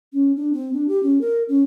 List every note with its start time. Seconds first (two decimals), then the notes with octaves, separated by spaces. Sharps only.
0.13 C#4
0.36 D4
0.53 C4
0.73 D4
0.88 G4
1.03 C#4
1.21 A#4
1.48 C#4